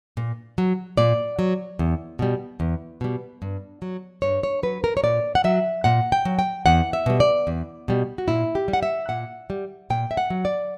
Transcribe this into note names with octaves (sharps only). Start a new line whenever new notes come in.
A#2
F#3
A#2 D5
F#3
E2
B2 G3
E2
B2 G3
G2
F#3
G2 C#5
C#5
F#3 B4
A#4
C#5
A#2 D5
F#5
F#3 E5
A#2 F#5
G5
F#3
G5
E2 F#5
E5
B2 G3
D5
E2
B2 G3
F#4
A#2 E4
G4
G3
F#5
E5
A#2 F#5
G3
A#2 G5
E5
F#5
F#3
D5